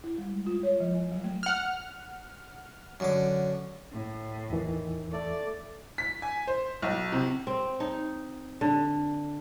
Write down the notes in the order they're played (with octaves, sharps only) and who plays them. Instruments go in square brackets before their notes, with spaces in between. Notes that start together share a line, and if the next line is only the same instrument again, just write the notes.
[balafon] E4
G3
G#3
F4
C#5
F3
G#5
F#3
A3
[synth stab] F#5 F6
[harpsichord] F#2 D3 D6
[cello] A2
[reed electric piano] E2 E3 [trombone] D#3
[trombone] A3 [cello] D5
[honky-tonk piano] B6
G#5
C5
B1
C3
[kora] C4
D#4
D3